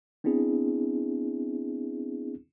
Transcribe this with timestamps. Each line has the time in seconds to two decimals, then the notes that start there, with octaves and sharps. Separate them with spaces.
0.24 B3 C4 D4 E4 G#4